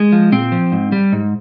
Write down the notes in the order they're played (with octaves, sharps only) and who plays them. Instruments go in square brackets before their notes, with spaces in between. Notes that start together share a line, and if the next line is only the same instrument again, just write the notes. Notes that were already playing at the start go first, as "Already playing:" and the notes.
Already playing: [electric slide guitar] G#3
F3
A#2 C4
F3
G#2
G3
G#2